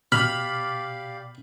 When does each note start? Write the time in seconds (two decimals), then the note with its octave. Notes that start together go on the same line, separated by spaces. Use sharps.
0.12 B2 G4 D5 F5 B5 F6